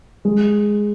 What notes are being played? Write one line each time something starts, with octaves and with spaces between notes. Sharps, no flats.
G#3